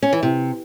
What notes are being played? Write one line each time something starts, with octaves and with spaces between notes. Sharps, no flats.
C#4
E3
C3